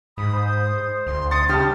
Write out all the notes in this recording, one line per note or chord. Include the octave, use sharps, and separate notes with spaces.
G#2 B5 D#6
C5
D2 C6
C6 D#6 A6 C#7
C#3 G3 G4 A5 F6